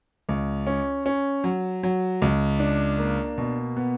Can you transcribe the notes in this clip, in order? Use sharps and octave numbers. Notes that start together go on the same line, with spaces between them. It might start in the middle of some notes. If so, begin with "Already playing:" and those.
C#2
C#4
C#4
F#3
F#3
C#2
D4
A#3
B2
B3